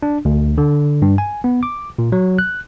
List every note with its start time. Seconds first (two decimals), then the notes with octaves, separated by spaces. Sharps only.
0.03 D4
0.25 D2
0.58 D3
1.02 G2
1.18 G#5
1.44 B3
1.63 D6
1.98 A#2
2.12 F#3
2.39 F#6